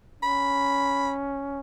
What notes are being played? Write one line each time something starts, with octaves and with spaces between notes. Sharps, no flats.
C#4 B5